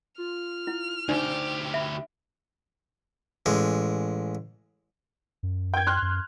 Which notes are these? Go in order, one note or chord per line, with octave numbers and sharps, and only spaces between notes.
F4 F6
E4
D2 D4 D#4 G4 C5 D5
E5 B5
A1 G#3
F#2
G5 G#6
C6 F6 F#6
F#2